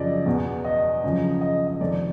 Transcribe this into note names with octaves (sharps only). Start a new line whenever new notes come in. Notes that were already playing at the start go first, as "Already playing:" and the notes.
Already playing: F#2 C#3 F3 D5 D#5
E2 B2
D#5
F#2 C#3 F3
D#5
D#5
F2 C3 D#3 D5